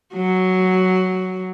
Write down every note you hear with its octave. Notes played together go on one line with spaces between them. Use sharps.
F#3